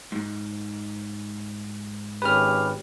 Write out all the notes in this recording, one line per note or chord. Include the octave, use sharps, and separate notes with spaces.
G#2
G#1 C#4 G4 B4 F6